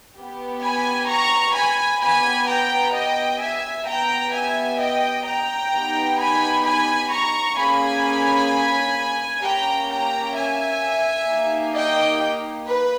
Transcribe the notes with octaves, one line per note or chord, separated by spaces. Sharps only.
B3 G4
G#5 B5
A#5 C#6
G#5 B5
B3 G4 G#5 B5
G5 A#5
D#5 G5
E5 G#5
B3 G4 G5 A#5
E5 G#5
D#5 G5
G5 A#5
B3 D#4 G4
G#5 B5
G#5 B5
A#5 C#6
A#3 C#4 G#4 G#5 B5
A#3 C#4 G4 G5 A#5
G5 A#5
E5 G#5
A#3 D#4 G4
D#5 G5
B4